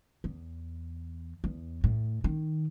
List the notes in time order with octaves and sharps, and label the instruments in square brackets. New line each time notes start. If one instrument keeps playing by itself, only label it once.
[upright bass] E2
E2
A2
D#3